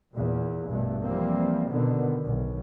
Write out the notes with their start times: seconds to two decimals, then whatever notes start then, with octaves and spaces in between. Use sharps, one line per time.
0.14 E2 A#2
0.69 A#1 G2 B2 A3
1.04 E3 F3 G3 A#3 C4
1.69 B2 D3 D#3 B3
2.25 B1